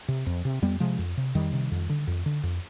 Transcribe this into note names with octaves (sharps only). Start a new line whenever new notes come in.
C3
F2
C3
F2 G3 B3
C3 F3 G#3
F2
C3
F2 D#3 G3
C3
F2
D3
F2
D3
F2